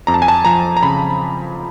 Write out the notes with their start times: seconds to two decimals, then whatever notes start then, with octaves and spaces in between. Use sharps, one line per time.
0.07 F2 A#5
0.14 A5
0.22 G#5
0.28 A5
0.45 F3 A#5
0.77 A#5
0.83 C#3 B5